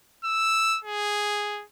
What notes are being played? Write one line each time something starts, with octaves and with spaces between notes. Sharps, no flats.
E6
G#4